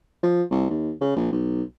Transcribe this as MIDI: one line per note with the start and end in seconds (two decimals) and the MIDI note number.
0.23 0.43 53
0.51 0.65 36
0.70 0.92 39
1.01 1.16 49
1.16 1.31 34
1.32 1.63 35